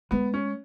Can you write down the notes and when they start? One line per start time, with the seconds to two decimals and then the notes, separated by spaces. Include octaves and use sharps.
0.11 G#3 B3
0.34 C#4